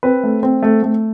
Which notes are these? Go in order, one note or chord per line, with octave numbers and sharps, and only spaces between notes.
C4 B4
A3
C4
A3
A3